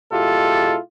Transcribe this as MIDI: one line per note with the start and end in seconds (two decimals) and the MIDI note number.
0.12 0.76 47
0.12 0.76 56
0.12 0.76 64
0.12 0.76 65
0.12 0.76 67
0.12 0.76 69